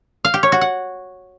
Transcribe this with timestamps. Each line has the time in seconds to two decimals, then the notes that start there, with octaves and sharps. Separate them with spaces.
0.25 F5
0.34 G4
0.43 C#5
0.52 F#4
0.61 F#5